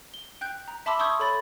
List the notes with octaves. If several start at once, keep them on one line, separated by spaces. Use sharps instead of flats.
G7
G5 F#6 G6
A#5
E5 A5 B5 C6 D6 E6
C6 C#6 D#6 E6 G6 G#6
A4 C#5 B5 A6